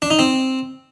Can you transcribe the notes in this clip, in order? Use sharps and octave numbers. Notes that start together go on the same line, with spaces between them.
D4
D#4
C4